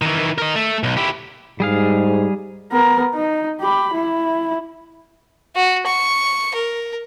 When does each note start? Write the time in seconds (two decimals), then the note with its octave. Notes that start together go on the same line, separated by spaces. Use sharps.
0.02 D#3 E3
0.38 A#4 D#5
0.56 A3
0.83 B1
0.97 E4 G4
1.60 G#2 G3 G#4 F5
2.72 B3 A#4
3.14 D#4
3.60 G4 B5
3.93 E4
5.56 F#4
5.86 C#6
6.54 A#4